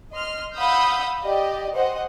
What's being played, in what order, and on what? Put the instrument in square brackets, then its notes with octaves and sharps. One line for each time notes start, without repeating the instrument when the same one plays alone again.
[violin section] D#5 C6 F6
F5 F#5 B5 D#6 E6 G6
G4 D5 D#5
C5 D#5 F#5